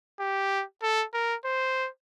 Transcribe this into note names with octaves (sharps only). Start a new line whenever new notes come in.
G4
A4
A#4
C5